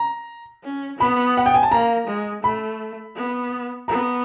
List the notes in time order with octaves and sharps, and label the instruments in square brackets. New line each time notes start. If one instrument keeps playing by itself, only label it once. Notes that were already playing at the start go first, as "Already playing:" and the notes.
Already playing: [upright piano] A#5
[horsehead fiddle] C#4
[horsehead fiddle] B3 [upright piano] B5
[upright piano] F#5
G5
G#5
A5
[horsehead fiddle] A#3 [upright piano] A#5
[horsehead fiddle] G#3
[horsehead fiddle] A3 [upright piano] B5
[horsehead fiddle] B3
[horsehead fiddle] B3 [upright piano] A#5